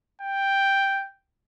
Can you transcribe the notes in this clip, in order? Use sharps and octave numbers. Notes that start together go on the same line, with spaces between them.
G5